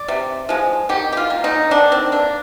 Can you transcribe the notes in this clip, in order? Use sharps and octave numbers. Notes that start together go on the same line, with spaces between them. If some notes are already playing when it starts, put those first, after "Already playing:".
Already playing: D5
C3
F3 G#3
D#3 G4
G4
F4
A#3
D#4
D#3 D4
C4
A#3 D4